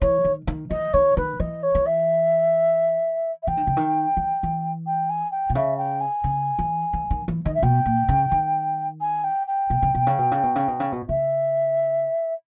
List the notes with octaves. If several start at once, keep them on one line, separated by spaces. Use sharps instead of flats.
E3 C#5
D#3
D#3
E3 D#5
D#3 C#5
D#3 B4
E3 D#5
C#5
E3
E5
E5
E3 G5
D#3
C#3
D#3
E3
E3
G5
G#5
G5
B2
C#3 E5
G5
G#5
C#3
E3
E3
D#3
E3
D#3 D#5
E5
B2 G5
A#2
C#3
D#3
G#5
G5
G5
B2
C#3
B2
C#3
B2
C#3
B2
C#3
B2
C#3
B2
C#3 E5